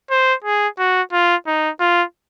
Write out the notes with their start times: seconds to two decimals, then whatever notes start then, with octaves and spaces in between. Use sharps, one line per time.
0.11 C5
0.44 G#4
0.79 F#4
1.12 F4
1.47 D#4
1.80 F4